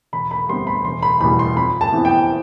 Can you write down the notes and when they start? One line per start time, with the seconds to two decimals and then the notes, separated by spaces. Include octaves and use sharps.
0.13 E1 B5
0.31 B5
0.48 D2 C3 G3 B3 C6
0.67 B5
0.84 E1 C6
1.03 B5
1.21 E2 B2 G3 B5
1.39 C6
1.56 F2 B5
1.81 A5
1.92 C3 E3 B3
2.05 G5